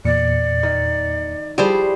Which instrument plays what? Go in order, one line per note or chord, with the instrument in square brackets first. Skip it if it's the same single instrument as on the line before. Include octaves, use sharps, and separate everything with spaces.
[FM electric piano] E2 A#2 C#7 [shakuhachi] D5
[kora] D#3
[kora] F3 G3 E4 [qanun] G4 G#4 C5